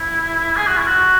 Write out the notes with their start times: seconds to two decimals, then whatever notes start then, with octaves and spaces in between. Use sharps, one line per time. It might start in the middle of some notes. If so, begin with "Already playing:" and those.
Already playing: E4
0.56 G#4
0.67 F#4
0.77 E4
0.87 F#4